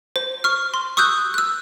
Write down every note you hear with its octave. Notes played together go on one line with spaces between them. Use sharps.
C5
C#6 F6
C6
C#6 D#6 E6 F#6 G6
E6 F#6